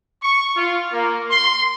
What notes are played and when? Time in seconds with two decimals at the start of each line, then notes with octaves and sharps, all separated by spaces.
0.21 C#6
0.55 F4
0.92 A#3
1.30 C6